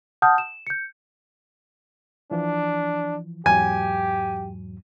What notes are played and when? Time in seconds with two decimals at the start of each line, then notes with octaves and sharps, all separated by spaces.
0.22 F#5 A5 D#6 F6 G6
0.38 E7
0.67 G6 C#7
2.31 E3 F3 D4
3.46 E2 G#2 F#3 G4 G#5